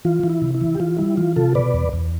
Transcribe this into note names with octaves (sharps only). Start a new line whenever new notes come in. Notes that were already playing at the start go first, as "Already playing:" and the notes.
E3 F4
E3
E4
C3
E4
E3
G4
E3 F4
G3 E4
E3 F4
C3 F4 A4
B2 B4 D5
E2
E2